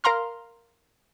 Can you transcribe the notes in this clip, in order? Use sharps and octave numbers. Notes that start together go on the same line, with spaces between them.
A#4 F5 A#5 C6 F6